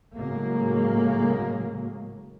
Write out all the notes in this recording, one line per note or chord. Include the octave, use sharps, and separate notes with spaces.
A2 C#3 F#3 G#3 A#3